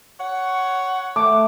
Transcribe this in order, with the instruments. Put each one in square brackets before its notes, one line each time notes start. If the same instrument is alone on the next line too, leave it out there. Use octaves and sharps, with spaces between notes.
[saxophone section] C#5 F#5
[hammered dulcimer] A3 [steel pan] D6